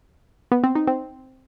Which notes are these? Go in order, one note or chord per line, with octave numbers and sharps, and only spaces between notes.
B3
C4
D#4
C4